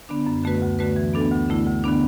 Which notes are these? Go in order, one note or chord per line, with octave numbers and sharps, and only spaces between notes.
D3 B3 D4
F#2
D3 A3 F#4 B4
D2
D3 A3 F#4 B4
E3
B3 D4 A4
D2
D3 A3 E4
D2
D3 B3 D4